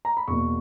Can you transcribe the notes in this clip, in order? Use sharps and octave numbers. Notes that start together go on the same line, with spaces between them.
A#5
B5
E2 B2 A#3 C#6